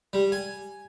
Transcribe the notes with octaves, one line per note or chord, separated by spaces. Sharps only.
G3
G#5